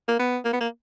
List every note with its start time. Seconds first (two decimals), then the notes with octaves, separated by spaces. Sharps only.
0.08 A#3
0.19 B3
0.45 A#3
0.53 B3
0.60 A#3